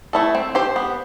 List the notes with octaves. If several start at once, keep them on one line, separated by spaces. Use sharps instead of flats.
A3 E4 A4
C4
G4 C5
B3